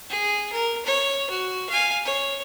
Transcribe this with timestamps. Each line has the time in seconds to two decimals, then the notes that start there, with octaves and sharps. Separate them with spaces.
0.10 G#4
0.52 A#4
0.86 C#5
1.30 F#4
1.69 F5 G#5
2.05 C#5